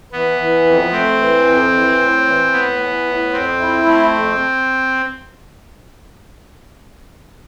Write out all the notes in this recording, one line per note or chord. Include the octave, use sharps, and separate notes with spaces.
E3 B3
E3
F2
A3 C4
E3
F2
E3
A2
E3
A2 B3
E3
A2
F2 C4
E4
A3
F2